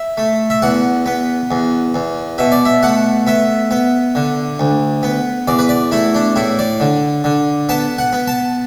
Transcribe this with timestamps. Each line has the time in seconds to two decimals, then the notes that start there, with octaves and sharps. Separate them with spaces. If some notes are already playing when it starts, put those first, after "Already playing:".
Already playing: E5
0.17 A3
0.50 E5
0.62 E2 F#5
1.06 B3
1.51 E2
1.94 E2
2.38 B2 E5
2.52 D5
2.65 E5
2.83 A3 F#5
3.27 B3 E5
3.71 B3
4.15 D3
4.59 D2
5.03 B3
5.48 E2 D5
5.59 B4
5.69 D5
5.92 A3 E4
6.14 D4
6.36 A2 E4
6.59 D5
6.80 D3
7.24 D3
7.69 B3 A5
7.98 F#5
8.13 B3
8.28 A5